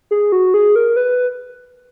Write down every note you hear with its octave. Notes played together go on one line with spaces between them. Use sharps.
G#4
F#4
G#4
A#4
B4